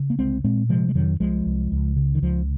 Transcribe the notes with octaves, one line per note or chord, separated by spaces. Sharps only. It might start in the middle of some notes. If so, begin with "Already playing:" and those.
Already playing: C#3
A#3
C2 G#3 C4
A#2 G#3 C4
C3 F3 G#3
G#3
F2 D#3 F#3
C2 F3 G#3
C2
C#2
C#3
D#3
C#2 F3